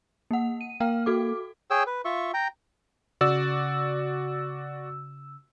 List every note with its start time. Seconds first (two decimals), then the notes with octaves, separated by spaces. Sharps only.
0.31 A#3 F#5
0.61 D#7
0.80 A#3 F5 G5 F6
1.06 F#4 A4 D6
1.71 G#4 C#5 G5 E6
1.87 B4
2.05 F4 E5 C#6
2.34 G5 A#5
3.21 C#3 F#4 D5 E6